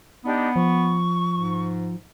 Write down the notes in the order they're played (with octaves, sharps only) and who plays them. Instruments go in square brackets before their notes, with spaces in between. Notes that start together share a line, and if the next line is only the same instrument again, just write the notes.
[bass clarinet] B3 [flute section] D4 D#4 G4
[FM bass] F3 [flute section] C#6
[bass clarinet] G#2